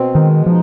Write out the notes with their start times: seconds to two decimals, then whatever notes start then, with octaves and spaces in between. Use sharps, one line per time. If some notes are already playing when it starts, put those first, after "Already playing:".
Already playing: B2 C4
0.15 D#3 G#3
0.46 F3 D#4